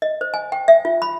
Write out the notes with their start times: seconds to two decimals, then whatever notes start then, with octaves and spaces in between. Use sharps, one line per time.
0.02 D#5
0.21 C5
0.34 G#5
0.52 G5
0.68 E5
0.85 F4
1.02 B5